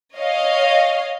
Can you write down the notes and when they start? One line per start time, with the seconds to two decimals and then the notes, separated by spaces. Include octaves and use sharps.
0.15 C#5 D#5 F5